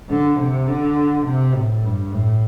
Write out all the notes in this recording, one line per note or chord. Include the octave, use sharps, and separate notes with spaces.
D3
C3
D3
C3
A2
G2
A2